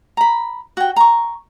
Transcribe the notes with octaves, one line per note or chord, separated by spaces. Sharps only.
A#5 B5
F#4 G5
A#5 C#6